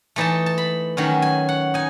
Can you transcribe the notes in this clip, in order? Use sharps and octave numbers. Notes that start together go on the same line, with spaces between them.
E3 A3 D#4 A5
A5
B5
D#3 F#3 C#4
G#5
F#5
D#4 G#5